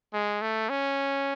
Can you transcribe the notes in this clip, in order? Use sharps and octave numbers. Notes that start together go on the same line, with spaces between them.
G#3
A3
C#4